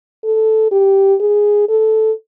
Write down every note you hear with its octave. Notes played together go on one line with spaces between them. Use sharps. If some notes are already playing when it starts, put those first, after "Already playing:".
A4
G4
G#4
A4